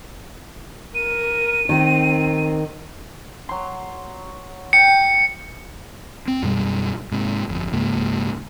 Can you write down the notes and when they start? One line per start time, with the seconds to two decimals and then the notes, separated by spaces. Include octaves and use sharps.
0.95 A#4 D#7
1.69 D#3 C4
3.49 F#3 C6
4.73 G5 C#7
6.28 C4
6.42 F#2 B2 G3
7.12 G#2 C3
7.49 G1 F2
7.73 C#2 G#2 A#3